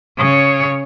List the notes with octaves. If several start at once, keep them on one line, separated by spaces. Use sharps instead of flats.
C#3 C#5